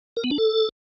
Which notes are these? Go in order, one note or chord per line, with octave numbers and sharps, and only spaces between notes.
A#4
B3
D4
A4